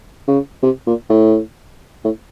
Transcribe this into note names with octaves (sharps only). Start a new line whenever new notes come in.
C#3
C3
A#2
A2
A2